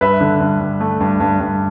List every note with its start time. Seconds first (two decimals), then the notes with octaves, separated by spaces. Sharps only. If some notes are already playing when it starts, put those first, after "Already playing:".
0.01 G2 B4 E5
0.21 D3
0.40 G2
0.60 G2
0.80 A3
1.01 G2
1.20 G2
1.40 G2